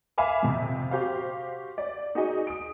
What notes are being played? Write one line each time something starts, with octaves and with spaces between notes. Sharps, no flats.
E5 F5 G#5 B5 D6
F2 C3
F#4 G4 C5 F5
D5
D#4 F#4 G#4 D#5
D#6 D7